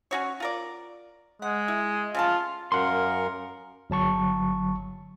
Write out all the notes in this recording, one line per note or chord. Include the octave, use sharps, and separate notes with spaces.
C#4 F#4 C#5
F4 A#4 D5
G#3 F#5
E4
C#3 A3 F4 A5
F#2 A#4 F5 F#5 C6
G1 F#3 A5 C#6